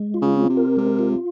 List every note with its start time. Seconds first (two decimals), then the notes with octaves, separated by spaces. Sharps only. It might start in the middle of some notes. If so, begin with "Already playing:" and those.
Already playing: G#3
0.14 F4
0.22 C#3
0.35 C4
0.50 C3
0.57 A#4
0.77 C3 G#3
0.99 F4